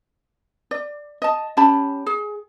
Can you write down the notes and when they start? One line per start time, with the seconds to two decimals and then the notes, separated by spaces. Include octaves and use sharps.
0.71 D5
1.22 D#5 A5
1.57 C#4 G4 A5 B5
2.06 G#4